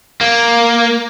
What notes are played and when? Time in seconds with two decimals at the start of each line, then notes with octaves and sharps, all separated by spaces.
0.21 A#3